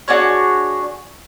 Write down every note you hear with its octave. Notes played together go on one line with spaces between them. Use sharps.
D4 F#4 G#4 C#5